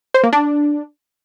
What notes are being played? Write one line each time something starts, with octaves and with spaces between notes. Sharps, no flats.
C5
A#3
D4